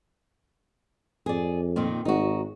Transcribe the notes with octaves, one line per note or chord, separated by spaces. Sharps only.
F2 G#4 D5
A#2 D#3 C4
G#1 D#4 F#4